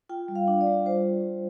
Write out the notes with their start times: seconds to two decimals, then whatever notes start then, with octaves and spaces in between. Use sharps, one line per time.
0.09 F4 G5
0.28 G3
0.36 F5
0.48 D4
0.61 D5
0.67 G3
0.85 F4 C5